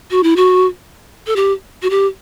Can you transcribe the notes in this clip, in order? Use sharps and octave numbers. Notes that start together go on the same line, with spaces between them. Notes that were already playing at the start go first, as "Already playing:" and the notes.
F#4
E4
F#4
A4
G4
F#4
G4